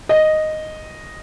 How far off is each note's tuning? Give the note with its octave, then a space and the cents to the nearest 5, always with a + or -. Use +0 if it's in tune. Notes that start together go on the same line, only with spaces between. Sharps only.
D#5 -5